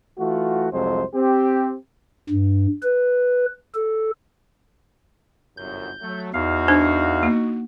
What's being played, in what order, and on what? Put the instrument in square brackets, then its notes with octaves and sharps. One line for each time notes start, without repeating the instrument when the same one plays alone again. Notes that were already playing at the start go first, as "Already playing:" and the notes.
[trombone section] E3 A3 F4 F#4
C2 F2 C3 F#3 G#3 C5
C4 G4
[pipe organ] G2
B4
A4
[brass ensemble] G1 C2 F#2 [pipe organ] G6
[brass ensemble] F#3 A3
[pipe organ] E2 F5 [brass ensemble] D#4 F#4
[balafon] D4 C5
A#3